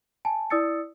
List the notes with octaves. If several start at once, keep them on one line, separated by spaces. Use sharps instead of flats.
G#5 A5
E4 D5 D#6 E6 A6 C#7